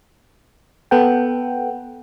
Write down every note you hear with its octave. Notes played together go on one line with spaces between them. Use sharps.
B3 A4 B4 F#5 G5